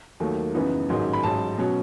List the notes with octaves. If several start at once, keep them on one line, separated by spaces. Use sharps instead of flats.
D#2 D#3 F#3 A3
F#2 C#3 E3 B3 D#4
A1 G#2 D#3 F#3
B5
A1 G#2 F#3 A5
B2 F#3 C#4